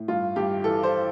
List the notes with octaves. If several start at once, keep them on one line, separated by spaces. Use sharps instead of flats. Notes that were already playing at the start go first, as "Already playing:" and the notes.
Already playing: A2
G2 F4
G2 G4
E3 A4
C5